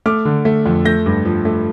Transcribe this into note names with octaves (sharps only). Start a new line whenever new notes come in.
A3 D6 F6
D3
A3
F2
A3 G6 A#6
G2
F3
A3